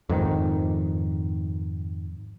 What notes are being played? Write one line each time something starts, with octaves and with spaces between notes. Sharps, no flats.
F2 G#2 D#3